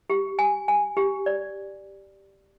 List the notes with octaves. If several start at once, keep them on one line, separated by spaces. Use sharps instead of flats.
G4
G#5
G#5
G4
D5